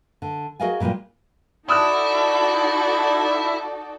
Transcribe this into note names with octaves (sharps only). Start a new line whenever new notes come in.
D3
F#4 G#4 A#4 D#5 F5 G#5
A#2 G3 G#3 A#3 F4
D#4 E4 F#4 A4 D5 D#6 E6 F#6